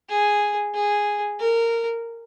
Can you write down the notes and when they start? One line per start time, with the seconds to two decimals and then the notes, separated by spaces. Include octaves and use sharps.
0.09 G#4
0.75 G#4
1.40 A#4